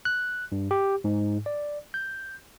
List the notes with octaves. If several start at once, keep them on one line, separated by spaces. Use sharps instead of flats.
F#6
G2
G4
G#2
D5
G6